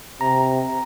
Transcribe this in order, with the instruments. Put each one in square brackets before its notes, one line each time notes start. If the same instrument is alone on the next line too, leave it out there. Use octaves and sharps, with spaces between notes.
[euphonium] C3 [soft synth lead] A#5